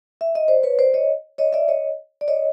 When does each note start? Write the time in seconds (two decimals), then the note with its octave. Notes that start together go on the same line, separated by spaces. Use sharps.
0.21 E5
0.35 D#5
0.48 C5 D5
0.63 B4 C#5
0.79 C5 D5
0.94 C#5 D#5
1.38 C#5 D#5
1.53 D5 E5
1.68 C#5 D#5
2.21 D5
2.28 C#5 D#5